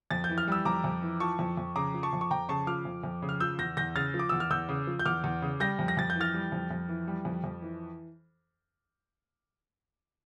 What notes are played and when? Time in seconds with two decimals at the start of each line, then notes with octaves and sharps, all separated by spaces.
0.11 F2 A6
0.24 G6
0.29 E3
0.38 F6
0.48 G3 E6
0.65 F2 A#5 D6
0.84 F2
1.02 E3
1.20 F3 A5 C#6
1.39 F2
1.57 F2
1.76 C#3 A#5 D6
1.94 F3
2.03 A5 C#6
2.13 F2
2.21 C#6
2.31 F2 G5 A#5
2.49 C#3 A5 C#6
2.67 F3 D6 F6
2.85 F2
3.04 F2
3.22 C#3
3.29 F6
3.40 F3 E6 G6
3.59 E2 G6 A#6
3.77 E2 G6 A#6
3.96 C#3 F6 A6
4.14 F3
4.19 D6
4.29 E2 E6
4.40 F6
4.51 E2 E6 G6
4.69 C#3
4.87 F3
4.99 G6
5.05 E2 D6 F6
5.24 E2
5.42 C#3
5.60 G3 G6 A#6
5.79 F2
5.88 A#6
5.97 F2 A6
6.10 G6
6.16 E3
6.21 F6 A6
6.34 G3
6.52 F2
6.71 F2
6.89 E3
7.07 G3
7.25 F2
7.44 F2
7.62 E3